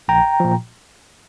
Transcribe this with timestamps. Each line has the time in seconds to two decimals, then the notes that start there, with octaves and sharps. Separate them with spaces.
0.08 A#1 G5 A#5
0.40 A#2 F3